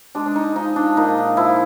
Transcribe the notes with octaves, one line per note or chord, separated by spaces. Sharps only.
G#3 D4
D4
D#4
F3 D#4
D4
A#2 D#4
F3 E4